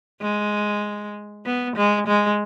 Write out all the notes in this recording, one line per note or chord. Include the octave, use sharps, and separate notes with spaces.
G#3
B3
G#3
G#3